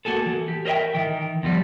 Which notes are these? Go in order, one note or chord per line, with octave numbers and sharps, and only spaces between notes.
A#3 F#4 G#4 A4
E3
G4
A#4 C5 D#5 E5 G5
D#3 E3
E2 F3 G3